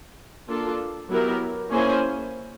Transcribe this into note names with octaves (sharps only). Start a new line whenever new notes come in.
A#3 D4 F4 A4
F#3 B3 E4 G4 A#4
A#3 C#4 E4 G#4 C5